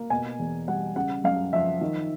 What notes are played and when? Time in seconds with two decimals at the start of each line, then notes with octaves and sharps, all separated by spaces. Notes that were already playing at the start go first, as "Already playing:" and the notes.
Already playing: A#3
0.10 B2 G#5
0.39 E2
0.68 G3 F#5
0.96 C#3 F#5
1.24 F#2 F5
1.53 F3 E5
1.81 D#3